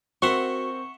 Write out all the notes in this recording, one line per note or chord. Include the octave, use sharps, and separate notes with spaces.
C4 F#4 A#4 E5 F#5 C6 C#6